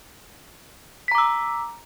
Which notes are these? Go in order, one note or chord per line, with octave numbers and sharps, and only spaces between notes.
A#5 D6 E6 B6